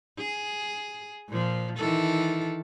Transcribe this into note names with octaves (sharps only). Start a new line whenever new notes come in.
G#4
A#2 F3
D#3 E3 A4